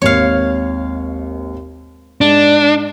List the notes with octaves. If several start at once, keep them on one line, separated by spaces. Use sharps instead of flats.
G#1 D#2 C#5 F5
G#2 D4